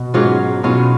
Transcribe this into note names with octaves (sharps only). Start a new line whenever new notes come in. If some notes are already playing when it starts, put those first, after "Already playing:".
Already playing: B2
G#2 F#3 C#4 F4
B2 F#3 C#4 F4